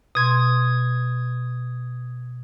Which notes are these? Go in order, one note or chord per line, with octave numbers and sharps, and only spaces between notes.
B2 C6 D#6 G#6